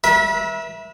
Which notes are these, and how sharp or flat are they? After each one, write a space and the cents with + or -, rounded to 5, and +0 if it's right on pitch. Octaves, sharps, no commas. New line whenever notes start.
B4 -45 E5 -5 B5 -30